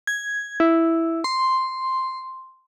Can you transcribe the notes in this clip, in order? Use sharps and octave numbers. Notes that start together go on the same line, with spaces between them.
G#6
E4
C6